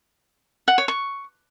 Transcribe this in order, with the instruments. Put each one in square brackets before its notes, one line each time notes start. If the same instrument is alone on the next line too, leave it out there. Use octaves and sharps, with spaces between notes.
[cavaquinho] F#5
C#5
C#6